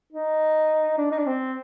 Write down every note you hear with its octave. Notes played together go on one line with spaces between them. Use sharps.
D#4
D4
D#4
D4
C4